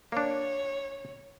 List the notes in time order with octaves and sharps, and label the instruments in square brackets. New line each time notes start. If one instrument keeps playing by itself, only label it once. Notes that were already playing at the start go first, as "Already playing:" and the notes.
[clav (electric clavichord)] A#3 D4 [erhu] C#5